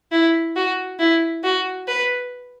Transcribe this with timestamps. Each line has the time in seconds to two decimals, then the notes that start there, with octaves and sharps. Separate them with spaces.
0.12 E4
0.56 F#4
0.99 E4
1.44 F#4
1.88 B4